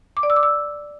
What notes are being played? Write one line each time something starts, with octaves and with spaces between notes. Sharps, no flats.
D6
D5
E6
D6
E6